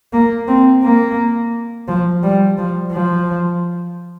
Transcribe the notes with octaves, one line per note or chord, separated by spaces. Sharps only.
A#3
C4
A#3
F3
G3
F3
F3